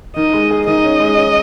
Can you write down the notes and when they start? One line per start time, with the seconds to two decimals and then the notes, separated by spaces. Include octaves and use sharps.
0.16 D#3 D#5
0.33 G#3
0.50 G#4
0.67 D#3 D#5
0.84 C#4
1.00 G#3
1.17 C#4